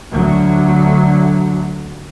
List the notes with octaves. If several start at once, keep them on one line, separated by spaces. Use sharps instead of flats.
D2 F#3